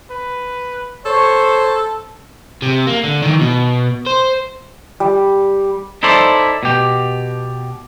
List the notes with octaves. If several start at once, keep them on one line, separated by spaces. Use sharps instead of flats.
B4
A4 C5 C#5
C3
A#3
D3
D#3 E3
B2
C5
G3
D#4 E4 A4 C5 D5
B2 G4